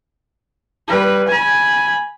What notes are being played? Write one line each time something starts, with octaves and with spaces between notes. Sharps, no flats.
G3 B4
G#5 B5